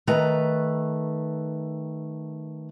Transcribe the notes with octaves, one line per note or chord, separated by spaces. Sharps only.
D#3 A3 B4 A#5